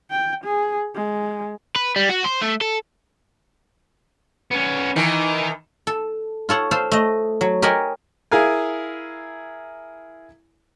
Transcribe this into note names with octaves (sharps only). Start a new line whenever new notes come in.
G5
G#4
G#3
B4
G3
F#4
C5
A3
A4
B3 C#4
D#3 E3 D#4 A#4
A4
F4 A4 C#5 F#5
A4 C5 F5
A3 D#5
F#3
G4 A#4 C#5 D#5 F#5 G#5
E4 G#4 A#4 F5 G#5